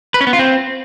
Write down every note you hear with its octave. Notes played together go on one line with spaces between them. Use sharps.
B4
C#4
B3
F4
C4